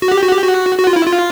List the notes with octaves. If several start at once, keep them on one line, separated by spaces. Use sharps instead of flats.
F#4
G4
F#4
G4
F#4
F#4
F4
E4
F4